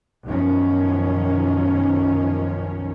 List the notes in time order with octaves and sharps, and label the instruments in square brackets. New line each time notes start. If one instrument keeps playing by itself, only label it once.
[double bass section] B1 F#2 D#3 F3 C#4